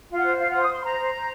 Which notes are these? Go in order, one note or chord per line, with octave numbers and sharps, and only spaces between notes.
F4
F#5
C5
F4 F5
F#5
C5
D#6
C5 C6
C6
C5 A#5
C5
C5